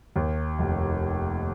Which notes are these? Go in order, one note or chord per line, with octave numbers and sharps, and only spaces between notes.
D#2
F1